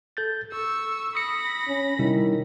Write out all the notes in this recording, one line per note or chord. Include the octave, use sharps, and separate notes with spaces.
A4 G6 A6
A4 C#6 E6
B5 D#6 A#6 C#7
C#4
C3 D#3 G3 E4